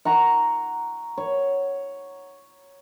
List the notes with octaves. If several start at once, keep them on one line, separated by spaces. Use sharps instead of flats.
F#5 A#5 C#6
C#5